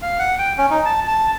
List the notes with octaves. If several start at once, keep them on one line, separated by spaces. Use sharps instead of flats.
F5
F#5
G5
C#4
D#4
A5
A5